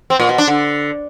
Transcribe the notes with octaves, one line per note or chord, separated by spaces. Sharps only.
C4
A#2
B2
D4
D3